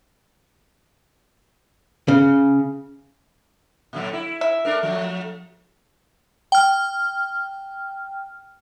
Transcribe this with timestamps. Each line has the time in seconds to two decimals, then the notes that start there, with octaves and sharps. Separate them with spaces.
2.08 C#3
3.93 A#2 D3 F#3
4.13 E4
4.41 E5
4.65 A3 D4 A#4
4.83 F3 F#3 A3
6.52 G5 F6